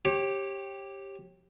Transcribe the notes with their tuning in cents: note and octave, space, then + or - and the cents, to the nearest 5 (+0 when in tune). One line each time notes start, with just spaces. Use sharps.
G4 +0 C#5 -30